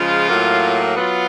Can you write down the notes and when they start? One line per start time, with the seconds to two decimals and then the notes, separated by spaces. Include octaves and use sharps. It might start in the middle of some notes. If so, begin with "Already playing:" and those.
Already playing: C#3 F3 G#3 F4
0.29 A2 F#3 A#3
0.97 F#3 B3 F4